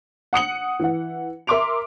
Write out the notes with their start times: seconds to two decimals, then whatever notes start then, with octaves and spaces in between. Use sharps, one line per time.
0.33 F#5 D#6 C#7 F#7
0.80 E3 F#5
1.47 A#4 E5 C6 D6 D7 F7